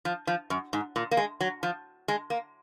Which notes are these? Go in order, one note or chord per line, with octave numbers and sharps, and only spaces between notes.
F3
F3
F#2
G#2
A#2
A#3
G#3
F#3
F3
G#3
A#3